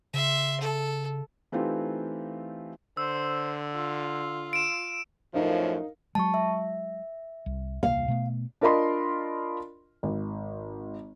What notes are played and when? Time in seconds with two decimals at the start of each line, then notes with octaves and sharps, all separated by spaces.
0.14 C#3 E5 C6
0.60 A4
1.52 E3 A3 C4 D#4 F4 G4
2.97 D3 C5 E6
3.75 F4
4.53 D7 E7
5.34 F#2 A2 F3 D#4 A#4 F5
6.15 F#3 G#3 A5 C#6
6.34 E5
7.46 C2
7.83 D#1 C2 A#3 F5
8.08 B2 A3 B3
8.61 D4 F4 A#4 D#5 B5 C6
10.03 G#1